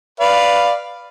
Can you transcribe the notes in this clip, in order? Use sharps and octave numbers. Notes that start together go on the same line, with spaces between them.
B4 D5 F5